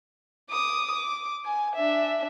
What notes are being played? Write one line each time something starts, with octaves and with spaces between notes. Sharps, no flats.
D6 D#6
D6
G#5
D4 E5